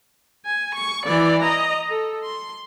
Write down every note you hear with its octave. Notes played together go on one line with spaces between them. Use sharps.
G#5
C#6
E3 D5
D#5 A#5
A4
C6